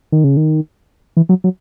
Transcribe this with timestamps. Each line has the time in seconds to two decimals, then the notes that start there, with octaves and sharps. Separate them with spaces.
0.12 D#3
0.24 C#3
0.37 D#3
1.17 E3
1.29 F#3
1.44 F#3